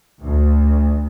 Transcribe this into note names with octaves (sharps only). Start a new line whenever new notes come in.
D2